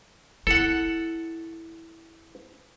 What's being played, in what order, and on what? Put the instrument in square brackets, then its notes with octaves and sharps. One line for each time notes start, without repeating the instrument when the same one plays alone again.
[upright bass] E4 [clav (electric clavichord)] A4 F#5